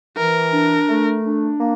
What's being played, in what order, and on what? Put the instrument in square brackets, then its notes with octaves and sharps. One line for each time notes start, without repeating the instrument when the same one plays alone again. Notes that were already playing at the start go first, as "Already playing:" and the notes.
[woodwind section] E3 [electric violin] A#4
[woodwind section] D4
A3
D4
A#3